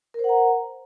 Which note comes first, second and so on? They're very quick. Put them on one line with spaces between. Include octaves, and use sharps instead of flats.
A#4 C5 F#5 A#5